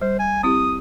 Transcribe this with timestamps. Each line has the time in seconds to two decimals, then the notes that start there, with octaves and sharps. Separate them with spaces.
0.02 G3 C5
0.19 G#5
0.43 C4 E4 G4 D#6